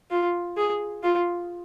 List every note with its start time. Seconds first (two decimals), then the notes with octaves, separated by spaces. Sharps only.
0.11 F4
0.57 G#4
1.03 F4